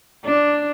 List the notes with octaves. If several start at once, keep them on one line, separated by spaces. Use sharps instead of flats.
D4